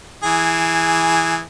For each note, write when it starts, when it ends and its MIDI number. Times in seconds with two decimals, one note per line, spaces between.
0.24 1.41 52
0.24 1.41 68